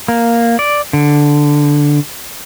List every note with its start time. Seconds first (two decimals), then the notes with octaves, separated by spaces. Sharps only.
0.08 A#3
0.59 D5
0.93 D3